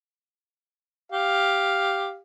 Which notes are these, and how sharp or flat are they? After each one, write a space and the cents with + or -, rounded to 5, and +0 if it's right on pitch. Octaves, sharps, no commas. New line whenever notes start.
G4 +0 F5 +0